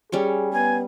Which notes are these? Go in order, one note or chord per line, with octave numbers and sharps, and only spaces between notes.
G3 C#4 G#4 C#5
B3 G#5